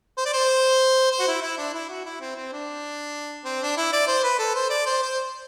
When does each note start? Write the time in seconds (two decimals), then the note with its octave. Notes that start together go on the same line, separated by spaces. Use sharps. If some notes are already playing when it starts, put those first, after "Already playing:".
0.18 C5
0.26 D5
0.33 C5
1.12 C5
1.20 F#4
1.27 E4
1.42 E4
1.58 D4
1.74 E4
1.89 F#4
2.05 E4
2.21 C4
2.36 C4
2.52 D4
3.45 C4
3.61 D4
3.77 E4
3.92 D5
4.07 C5
4.24 B4
4.39 A4
4.55 C5
4.70 D5
4.86 C5
5.02 C5